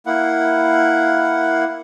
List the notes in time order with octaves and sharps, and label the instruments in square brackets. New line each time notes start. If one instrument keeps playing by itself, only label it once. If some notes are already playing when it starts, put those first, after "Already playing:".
[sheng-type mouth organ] A#3 E4 F#5